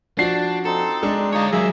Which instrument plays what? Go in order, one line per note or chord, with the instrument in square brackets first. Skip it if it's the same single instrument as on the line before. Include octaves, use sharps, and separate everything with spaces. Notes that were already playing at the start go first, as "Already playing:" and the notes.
[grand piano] F3 F#4 C7 [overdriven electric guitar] D4
[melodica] C4 D#4 [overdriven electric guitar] A4
[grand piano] G#3 D4
[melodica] D#4 G#4 [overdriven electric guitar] F4 C#5
[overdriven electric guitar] F#3 G#3 [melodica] A#3 E5 E6 [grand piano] G#4